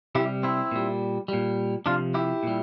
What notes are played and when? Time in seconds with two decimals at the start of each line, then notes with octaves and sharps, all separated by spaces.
0.15 C3 E4 G4
0.20 G3
0.43 C4 E4
0.71 A#2 G3
1.28 A#2 G3
1.86 C3 F3 D4 F4
2.14 E4 G4
2.43 A#2 G3